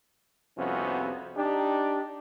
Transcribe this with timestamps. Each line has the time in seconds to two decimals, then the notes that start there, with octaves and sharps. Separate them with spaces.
0.57 C2 F2 C3 B3 C#4 F#4
1.36 D4 D#4 G4